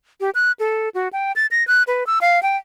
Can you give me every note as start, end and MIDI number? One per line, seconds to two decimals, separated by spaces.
0.21 0.30 67
0.35 0.52 90
0.60 0.89 69
0.95 1.08 66
1.13 1.32 79
1.36 1.46 93
1.51 1.66 94
1.67 1.83 90
1.87 2.06 71
2.07 2.19 88
2.21 2.42 77
2.43 2.57 79